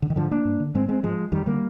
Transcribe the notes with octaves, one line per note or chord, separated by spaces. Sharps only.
D3
D#3
G#2 D3 F3
A#3 D4
G2
D3
G#2 G#3 C4
G#3 C4
G#2 F3 G#3
F2 D#3 G3
D3 G3 A#3